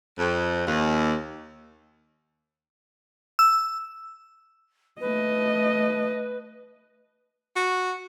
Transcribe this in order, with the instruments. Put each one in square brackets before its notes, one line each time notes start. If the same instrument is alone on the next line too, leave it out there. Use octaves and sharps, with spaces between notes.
[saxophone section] F2
D#2
[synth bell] E6
[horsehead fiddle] A3 D#5 [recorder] B4
[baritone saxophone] F#4